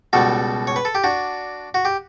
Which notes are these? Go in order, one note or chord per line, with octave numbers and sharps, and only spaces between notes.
C#2 B2 G3 F#4 A4
C#5
B4
A4
G4
D4 F#4
F#4
G4